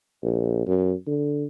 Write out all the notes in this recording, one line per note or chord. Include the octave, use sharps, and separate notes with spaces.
A#1
F#2
D3